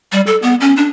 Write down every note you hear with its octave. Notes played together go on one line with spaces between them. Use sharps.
G3
A4
B3
C#4
D4